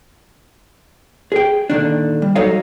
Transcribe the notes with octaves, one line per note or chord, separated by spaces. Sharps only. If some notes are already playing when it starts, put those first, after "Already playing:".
G#4 G5
A#2 D3 D#3 D4
G3
F#3 D#4 A4 C#5 D#5 F5